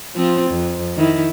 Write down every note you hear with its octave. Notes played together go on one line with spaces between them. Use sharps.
F3 C4 F4
F2
D#3 E4